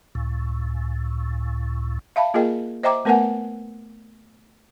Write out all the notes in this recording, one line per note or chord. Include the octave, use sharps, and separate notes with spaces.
C#2 A2
E5 F5 A5 B5
A#3 F4 G#4 A#4 D#5 G5
C5 D#5 E5 G5 A#5 D6
A3 B3 A#4 B4 F#5 G#5